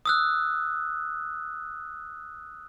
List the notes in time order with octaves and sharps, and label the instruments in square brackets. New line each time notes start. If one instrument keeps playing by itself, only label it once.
[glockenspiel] D#6 E6 F#6